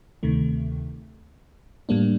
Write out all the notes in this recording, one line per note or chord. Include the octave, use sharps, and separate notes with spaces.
D2 C3 D#3 A3
A2 G3 A#3 D4